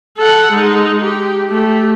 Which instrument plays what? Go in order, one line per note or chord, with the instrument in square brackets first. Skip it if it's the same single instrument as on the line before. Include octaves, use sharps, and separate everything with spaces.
[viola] A4 F#5
G#3 D#4
G4
A3 G4